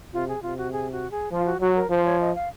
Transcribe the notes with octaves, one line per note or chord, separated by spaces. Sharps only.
C3 F4
G#4
C3 F4
F#4
G#4
F#4
G#4
F3 F4
F#4
F#3 F#4
A#4
F3 C5
C#5
D#5
F5